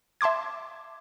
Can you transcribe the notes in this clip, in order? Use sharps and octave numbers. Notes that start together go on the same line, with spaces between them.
E5 A5 C6 D6 G#6